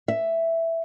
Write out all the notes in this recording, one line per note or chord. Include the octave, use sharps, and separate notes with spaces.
E5